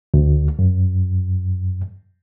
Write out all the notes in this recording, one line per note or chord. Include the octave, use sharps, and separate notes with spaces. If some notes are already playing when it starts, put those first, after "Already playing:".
D2
F#2